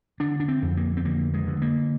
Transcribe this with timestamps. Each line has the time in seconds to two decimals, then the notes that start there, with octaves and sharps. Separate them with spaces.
0.20 D3 D4
0.40 D4
0.48 C4
0.62 F2
0.77 A#3
0.97 C4
1.05 D3 A#3
1.34 G#3
1.47 D3
1.62 A#3